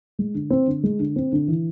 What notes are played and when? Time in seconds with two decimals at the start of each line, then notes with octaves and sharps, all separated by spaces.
0.19 G#3
0.34 D3
0.50 C4
0.67 D3
0.83 G#3
0.99 D3
1.16 C4
1.32 D3
1.48 E3